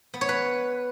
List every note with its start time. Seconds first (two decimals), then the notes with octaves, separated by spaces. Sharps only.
0.14 B3
0.21 C#5
0.29 B4